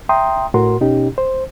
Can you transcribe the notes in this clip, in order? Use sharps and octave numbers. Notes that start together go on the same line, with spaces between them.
E5 G5 A#5 C6 D#6
A2 F#4 A#4 C6
B2 C#4 D#4 G4
C5